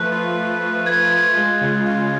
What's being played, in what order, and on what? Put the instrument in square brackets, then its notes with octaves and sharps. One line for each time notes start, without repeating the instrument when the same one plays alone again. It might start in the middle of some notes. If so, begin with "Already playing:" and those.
Already playing: [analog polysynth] F3 A3 B4 [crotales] F#6
[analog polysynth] F4
A3
F3
[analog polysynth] B4 [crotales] G#6
[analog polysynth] F4 [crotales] G#6
[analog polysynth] G#3
C#3
F4